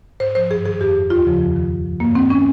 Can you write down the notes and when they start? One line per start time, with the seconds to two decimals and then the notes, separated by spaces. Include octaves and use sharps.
0.20 G#2 C5
0.35 F3 C5
0.50 G2 G#4
0.66 D#3 G#4
0.81 F2 G4
0.96 D#3
1.10 D#2 F4
1.26 C#3 F3
1.41 F2
1.56 D#3
1.71 G#2
1.85 F3
2.00 G2 A#3
2.15 D#3 C4
2.30 C#4